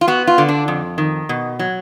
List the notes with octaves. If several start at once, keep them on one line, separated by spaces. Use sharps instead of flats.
F4
B3 F#4
F4
D3
D4
F2
D#3
B2
F#3